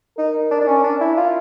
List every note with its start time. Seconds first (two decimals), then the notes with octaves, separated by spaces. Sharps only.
0.17 D#4 A#4
0.51 D4
0.61 D4
0.67 C#4
0.84 D4
1.01 E4
1.17 F4